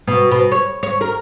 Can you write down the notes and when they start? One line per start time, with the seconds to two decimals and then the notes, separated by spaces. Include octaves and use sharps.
0.07 B2
0.31 B2
0.52 C#5
0.83 C#5
1.01 A#4